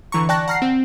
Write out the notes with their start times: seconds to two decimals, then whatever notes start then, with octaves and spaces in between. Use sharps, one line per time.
0.12 D3 E3 A#5 C#6
0.29 D5 G5 A5 C#6 F#6 A#6
0.48 F#5 A#5 F6 A#6 C7
0.62 C4